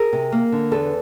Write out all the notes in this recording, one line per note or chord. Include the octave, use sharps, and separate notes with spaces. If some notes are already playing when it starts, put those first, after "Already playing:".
Already playing: G#4 A#4
C3
A#3
D3
E2 A4 B4